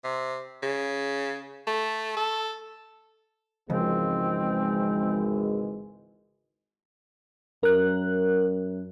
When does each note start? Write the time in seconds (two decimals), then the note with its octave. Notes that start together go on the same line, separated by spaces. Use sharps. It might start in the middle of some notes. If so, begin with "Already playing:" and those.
0.04 C3
0.62 C#3
1.67 A3
2.17 A4
3.70 G#1 C#2 E3 F3 G#3 C4
7.63 F#2 A#4 F#6